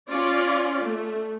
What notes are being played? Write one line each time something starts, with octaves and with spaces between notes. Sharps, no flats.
C#4 F4 D5
A3